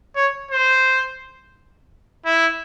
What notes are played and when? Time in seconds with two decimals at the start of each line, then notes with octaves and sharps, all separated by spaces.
0.16 C#5
0.51 C5
2.26 E4